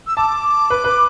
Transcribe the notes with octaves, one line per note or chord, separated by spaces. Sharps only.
E6
A5 D6
B4
B4